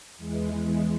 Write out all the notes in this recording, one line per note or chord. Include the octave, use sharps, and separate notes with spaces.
E2 E3 G#3